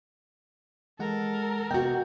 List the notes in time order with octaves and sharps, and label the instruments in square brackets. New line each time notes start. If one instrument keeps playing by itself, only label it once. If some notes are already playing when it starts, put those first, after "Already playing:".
[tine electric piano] E3 G#3 F#5 [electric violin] A4 A#4
[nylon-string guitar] C3 F#4 [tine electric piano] B3 D#5 A#5 [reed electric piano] G5